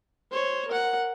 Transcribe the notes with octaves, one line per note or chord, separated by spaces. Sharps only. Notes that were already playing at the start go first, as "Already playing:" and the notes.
C5 C#5
A#4 F#5